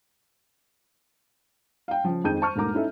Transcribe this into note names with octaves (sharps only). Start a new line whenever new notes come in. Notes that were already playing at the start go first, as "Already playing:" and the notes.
F5 G5
C#3 F3
F2 D#3 G#3 A5 G6 D#7
C5 A5 C#6 F6
E1 G#2 A3 A#3 A#5 D6
C#4 D#4 E4 A4 E5